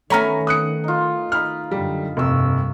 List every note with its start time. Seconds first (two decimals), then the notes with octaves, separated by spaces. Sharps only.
0.10 D#3 A3 B3 C#4 C#5 A#5 F6
0.47 D#6 F#6 C#7
0.84 D#4 F4
1.32 D#4 B5 F6
1.71 F#2 D3 G3
2.17 F1 C2 G2 C3 A#3 C#6 E6